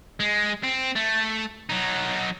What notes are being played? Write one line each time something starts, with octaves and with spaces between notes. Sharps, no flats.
G#3
C4
A3
F#3 D#4